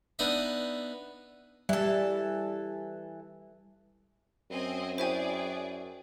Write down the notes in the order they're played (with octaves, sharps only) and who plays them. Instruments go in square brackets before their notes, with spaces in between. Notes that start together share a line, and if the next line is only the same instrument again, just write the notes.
[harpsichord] B3 D4 D#4 D#5 E5
[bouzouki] E3 A4 [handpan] G3
[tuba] F#2 [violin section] C4 D#5 G#5
[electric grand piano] E4 F#4 G5 [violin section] G#4 D5 [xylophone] C5 E5 G#5